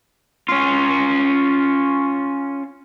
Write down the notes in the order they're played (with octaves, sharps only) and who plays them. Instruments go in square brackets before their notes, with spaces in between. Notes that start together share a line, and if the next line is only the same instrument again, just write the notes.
[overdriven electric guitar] C#4 F4